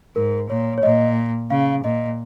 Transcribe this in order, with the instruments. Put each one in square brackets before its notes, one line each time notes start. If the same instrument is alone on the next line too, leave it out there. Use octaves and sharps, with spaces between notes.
[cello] G#2 [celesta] A#4
[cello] A#2 [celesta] C#5
[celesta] C#5
[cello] A#2 [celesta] D#5
[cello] C#3 [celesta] F5
[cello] A#2 [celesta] D#5